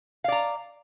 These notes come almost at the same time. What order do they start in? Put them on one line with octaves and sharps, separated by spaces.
F5 D5 A#5